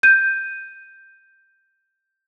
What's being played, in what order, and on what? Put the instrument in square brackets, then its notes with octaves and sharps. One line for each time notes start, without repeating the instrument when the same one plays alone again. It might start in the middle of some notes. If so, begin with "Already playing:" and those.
[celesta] G6 D#7